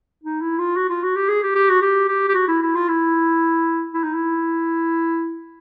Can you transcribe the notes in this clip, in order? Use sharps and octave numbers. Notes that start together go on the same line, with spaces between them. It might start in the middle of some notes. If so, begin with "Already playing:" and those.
D#4
E4
F4
F#4
F4
F#4
G4
G#4
G4
G4
F#4
G4
G4
G4
F#4
E4
E4
F4
E4
E4
D#4
E4